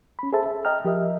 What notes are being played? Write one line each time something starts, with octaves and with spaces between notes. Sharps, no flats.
C#4 B5
G#4 A4 C5 E5 A5
E5
D#5 G5 A#5 F6
F3 G4 A#4 D#5 E5